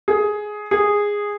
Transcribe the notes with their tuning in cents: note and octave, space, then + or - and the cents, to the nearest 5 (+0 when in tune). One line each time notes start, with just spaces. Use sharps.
G#4 +10
G#4 -10